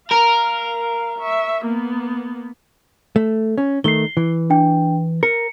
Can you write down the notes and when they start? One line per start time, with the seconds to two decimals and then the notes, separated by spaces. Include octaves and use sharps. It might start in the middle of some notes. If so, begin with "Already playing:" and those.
0.11 A#4 F5
1.19 E5 C#6
1.65 A#3 B3
3.16 A3
3.58 C#4
3.84 D#3 A3 C7 G7
4.17 E3
4.50 D4 G5
5.23 A#4 C#7